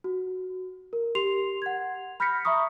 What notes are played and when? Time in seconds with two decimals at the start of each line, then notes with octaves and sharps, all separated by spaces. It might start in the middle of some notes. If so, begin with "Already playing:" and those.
0.04 F#4
0.93 A#4
1.15 G4 C6 C7 F7
1.62 F#5 G#6
2.20 B5 F6 G6 A#6 B6 C#7
2.45 E5 A#5 B5 C#6 D#6